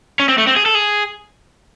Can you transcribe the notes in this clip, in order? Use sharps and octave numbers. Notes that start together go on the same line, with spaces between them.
C#4
C4
A3
C4
G#4
A4
G#4